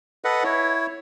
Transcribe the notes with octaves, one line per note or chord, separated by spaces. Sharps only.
A4 B4 D#5 F#5
E4 C#5